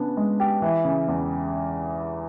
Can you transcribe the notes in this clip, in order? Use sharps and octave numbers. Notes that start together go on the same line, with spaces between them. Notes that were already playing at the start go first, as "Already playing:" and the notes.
Already playing: C#3 B3 D4
G#3
G4
E3
C#3
E2